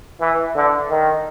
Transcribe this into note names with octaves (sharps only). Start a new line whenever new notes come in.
E3
D3
D#3